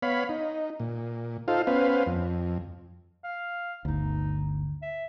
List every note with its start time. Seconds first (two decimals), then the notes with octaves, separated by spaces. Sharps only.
0.02 B3 C#5 F5 B5
0.29 D#4
0.80 A#2
1.48 D#4 F4 A4 C5 F5
1.67 B3 C#4 B4 C5 F5
2.06 F2
3.24 F5
3.85 G1 D2 D#4
4.82 E5